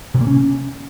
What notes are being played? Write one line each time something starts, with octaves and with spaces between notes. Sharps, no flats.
C3
A#3
C#4